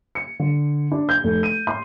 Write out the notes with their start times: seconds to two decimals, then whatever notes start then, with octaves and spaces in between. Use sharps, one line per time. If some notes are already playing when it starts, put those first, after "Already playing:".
0.15 C#7
0.40 D3
0.92 D4
1.09 G6
1.24 F1
1.43 D#7
1.67 C6